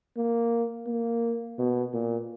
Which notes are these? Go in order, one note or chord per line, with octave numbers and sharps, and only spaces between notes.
A#3
A#3
B2
A#2